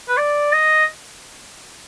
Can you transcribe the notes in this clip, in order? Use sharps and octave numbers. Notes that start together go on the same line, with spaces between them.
B4
D5
D#5